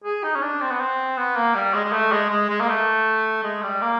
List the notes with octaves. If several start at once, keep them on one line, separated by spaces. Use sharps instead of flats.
G#4
D#4
C#4
D4
C4
B3
C4
B3
A#3
G3
G#3
G#3
A3
G#3
G#3
G#3
A#3
A3
G#3
G3
A#3